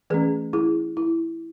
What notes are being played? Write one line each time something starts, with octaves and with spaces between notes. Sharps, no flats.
E3 A3 C#4 G#4 B4
E4 G#4
E4